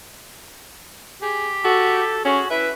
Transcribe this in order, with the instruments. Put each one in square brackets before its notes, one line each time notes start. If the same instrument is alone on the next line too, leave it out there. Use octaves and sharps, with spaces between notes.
[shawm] G4 [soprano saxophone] G#4
[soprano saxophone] F#4 [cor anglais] A4
[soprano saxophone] C#4 [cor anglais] F#4 [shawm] G#4
[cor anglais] E4 [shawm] B4 [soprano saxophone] E5